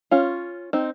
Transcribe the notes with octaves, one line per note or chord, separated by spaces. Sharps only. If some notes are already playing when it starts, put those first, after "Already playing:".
C#4 F4
C4 D#4